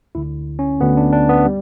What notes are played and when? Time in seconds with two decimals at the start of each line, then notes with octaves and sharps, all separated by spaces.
0.15 D2 D3 E4
0.59 C#4
0.80 D2 D3 B3
0.97 D4
1.13 D4
1.29 B3
1.45 G3